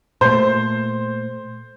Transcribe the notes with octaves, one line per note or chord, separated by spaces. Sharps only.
A#2 A3 C5